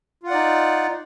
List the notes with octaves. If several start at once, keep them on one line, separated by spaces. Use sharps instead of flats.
D#4 F4 D5 F#5